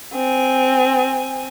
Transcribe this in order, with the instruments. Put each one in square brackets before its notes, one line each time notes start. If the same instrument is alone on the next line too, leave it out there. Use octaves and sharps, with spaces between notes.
[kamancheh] C4 G#5